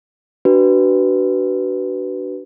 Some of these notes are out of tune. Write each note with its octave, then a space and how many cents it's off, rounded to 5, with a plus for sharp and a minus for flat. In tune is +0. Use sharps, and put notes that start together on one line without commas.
D4 +0 F#4 +35 B4 +0